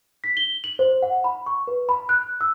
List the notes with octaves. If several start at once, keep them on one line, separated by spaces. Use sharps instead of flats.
B6
G7
F#7
C5
F#5
B5
C#6
B4
B5
F#6
E6